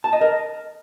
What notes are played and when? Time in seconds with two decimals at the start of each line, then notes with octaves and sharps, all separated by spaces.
0.04 A5
0.13 D#5
0.21 A#4